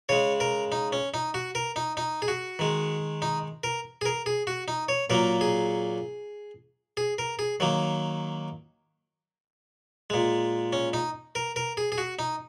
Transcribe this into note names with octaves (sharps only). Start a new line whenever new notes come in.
C#3 G#3 C#5
A#4
D#4
C#4
D#4
F#4
A#4
D#4
D#4
G#4
F#4
D#3 G#3
D#4
A#4
G#4
A#4
G#4
F#4
D#4
C#5
A#2 F#3 A#3 A#4
G#4
G#4
A#4
G#4
D#3 F#3 A#3
A#2 G#3
C#4
D#4
A#4
A#4
G#4
G#4
F#4
D#4